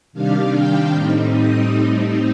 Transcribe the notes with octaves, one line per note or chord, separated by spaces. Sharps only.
C3 D#3 G3 D4 F5
G5
A2 G3 C4 D#4
D#6
A2 G3 C4 D#4